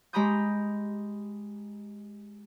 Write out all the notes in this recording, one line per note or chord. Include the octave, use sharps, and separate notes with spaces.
G#3 G4 A#5 B5 D#6 G6